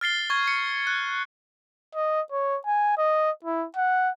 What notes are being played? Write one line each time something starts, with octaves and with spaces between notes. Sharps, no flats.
F6 A6 C7 G7
C#6 G#6
C#7
F#6
D#5
C#5
G#5
D#5
E4
F#5